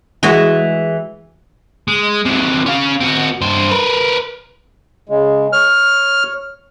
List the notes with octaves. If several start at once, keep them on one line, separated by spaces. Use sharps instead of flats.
E3 G#3 F#4
G#3
C3 F#3
C#4 F5
C4 F#4
G2 C5
A#4 B4
C#3 G#3
C#5 F6